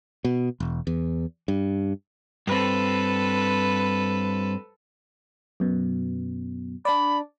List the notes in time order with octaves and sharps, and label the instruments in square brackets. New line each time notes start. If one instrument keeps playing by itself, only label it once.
[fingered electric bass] B2
E1
E2
G2
[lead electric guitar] G2 C4 [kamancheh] A4 B4
[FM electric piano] F#2 B2
[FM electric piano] D4 D5 [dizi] B5